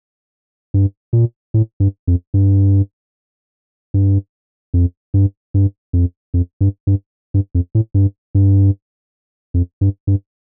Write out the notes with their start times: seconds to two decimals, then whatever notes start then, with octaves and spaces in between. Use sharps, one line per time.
0.74 G2
1.13 A#2
1.54 A2
1.80 G2
2.07 F2
2.34 G2
3.94 G2
4.74 F2
5.14 G2
5.54 G2
5.93 F2
6.34 F2
6.61 G2
6.87 G2
7.34 G2
7.55 F2
7.75 A2
7.94 G2
8.35 G2
9.54 F2
9.81 G2
10.07 G2